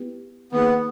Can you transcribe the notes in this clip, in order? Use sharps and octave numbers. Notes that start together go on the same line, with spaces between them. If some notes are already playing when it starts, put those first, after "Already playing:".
Already playing: B3 E4 G4 B4
D#3 A#3 B3 D#4 G#4